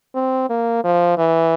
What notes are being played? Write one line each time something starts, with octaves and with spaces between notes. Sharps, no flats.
C4
A#3
F3
E3